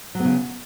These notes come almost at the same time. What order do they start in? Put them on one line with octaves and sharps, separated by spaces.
F#3 B3 C#3